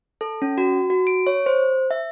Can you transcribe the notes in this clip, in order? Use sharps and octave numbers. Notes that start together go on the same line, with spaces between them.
A4
C#4
F#4
F#4
D7
C#5
C5
E5